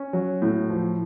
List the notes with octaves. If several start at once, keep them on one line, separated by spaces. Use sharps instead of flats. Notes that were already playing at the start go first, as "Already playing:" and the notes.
Already playing: C#4
F#3
A2
F3